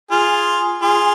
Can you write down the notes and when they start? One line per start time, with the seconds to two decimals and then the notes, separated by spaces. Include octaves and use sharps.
0.11 F4 G#4
0.82 F4 G#4